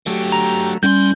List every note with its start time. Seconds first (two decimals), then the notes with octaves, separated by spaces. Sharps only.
0.07 D3 F#3 A3 G4
0.32 A#5
0.83 A2 G3 C#4 C6 G6